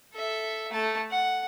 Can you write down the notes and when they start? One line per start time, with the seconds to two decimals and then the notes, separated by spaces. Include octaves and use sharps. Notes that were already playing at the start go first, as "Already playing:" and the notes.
0.14 A4 E5
0.72 A3 A5
1.11 F#5